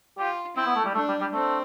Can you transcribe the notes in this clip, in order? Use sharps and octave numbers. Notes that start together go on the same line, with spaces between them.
F4 G4
C4 E4
B3
A3
G3
A3 D4
G3
G3
A3 C4